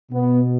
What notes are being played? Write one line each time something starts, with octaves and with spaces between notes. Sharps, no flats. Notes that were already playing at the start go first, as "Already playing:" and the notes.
B2 B3